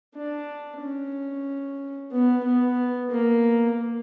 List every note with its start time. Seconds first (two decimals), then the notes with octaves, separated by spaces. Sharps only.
0.15 D4
0.81 C#4
2.12 B3
2.44 B3
3.10 A#3